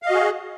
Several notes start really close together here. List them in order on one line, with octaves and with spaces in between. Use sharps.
F5 D#5 F#4 G#4